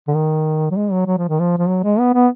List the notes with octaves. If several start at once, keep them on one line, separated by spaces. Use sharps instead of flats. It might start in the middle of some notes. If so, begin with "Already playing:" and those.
D3
D#3
F#3
G#3
F#3
F#3
F3
D#3
F3
F3
F#3
G#3
B3
B3